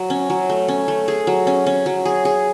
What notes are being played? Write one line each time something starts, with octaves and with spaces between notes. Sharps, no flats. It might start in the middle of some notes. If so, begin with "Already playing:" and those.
Already playing: F#3
C#4
F#3
A3
C#4
A3
G#4
F#3
C#4
C#4
F#3
G#4
G#4